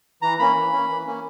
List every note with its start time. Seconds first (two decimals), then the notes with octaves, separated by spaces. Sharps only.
0.22 E3 A#5
0.39 A#3 C#4 B5
0.56 E3
0.72 A#3 C#4
0.90 E3
1.06 A#3 C#4